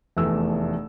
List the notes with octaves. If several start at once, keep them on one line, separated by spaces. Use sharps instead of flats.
F1 E2 A3 E6